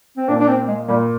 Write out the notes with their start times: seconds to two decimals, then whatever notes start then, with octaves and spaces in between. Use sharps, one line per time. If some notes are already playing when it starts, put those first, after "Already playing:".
0.17 C4
0.28 A#2 D4
0.40 D4
0.48 C4
0.68 G#3
0.88 A#2 G3